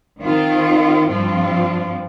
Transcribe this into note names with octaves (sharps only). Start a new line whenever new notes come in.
D#3 C4 F4
G2 F3 C4 F4